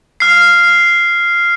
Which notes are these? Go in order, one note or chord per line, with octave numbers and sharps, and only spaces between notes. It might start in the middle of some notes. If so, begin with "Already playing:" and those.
F6 C7